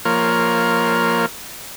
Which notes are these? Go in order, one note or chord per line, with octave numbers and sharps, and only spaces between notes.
F3 A#3 A#4 C#5